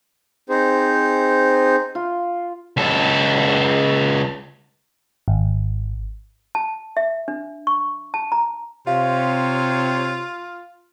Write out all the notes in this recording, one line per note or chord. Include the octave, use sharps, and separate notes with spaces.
C4 D#4 G#4 C5
F4
C#2 A4
G#1
A5
E5
D4
C#6
A5
A#5
C3 F4 C5 C#5 F5